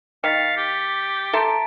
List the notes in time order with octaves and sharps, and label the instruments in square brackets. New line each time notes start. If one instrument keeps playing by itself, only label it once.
[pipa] D#3 [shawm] F5 [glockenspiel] A6 B6 C#7
[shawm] G4
[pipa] A4 E5 C6 [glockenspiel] A5 A#5 D7